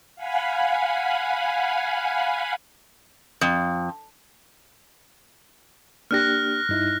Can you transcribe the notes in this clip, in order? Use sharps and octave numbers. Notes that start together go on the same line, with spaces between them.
F5 F#5 G#5 B5
F2
A#3 D4 G4 F6 F#6 A#6
G2 D#4 E4